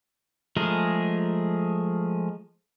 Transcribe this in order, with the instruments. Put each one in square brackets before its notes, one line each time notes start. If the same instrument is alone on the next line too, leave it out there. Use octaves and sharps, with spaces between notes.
[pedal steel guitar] F3 G#3 A3 G#4 A#4